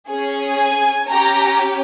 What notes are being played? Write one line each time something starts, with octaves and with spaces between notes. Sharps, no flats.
C#4 G#4
G#5
C#4 G4 A#5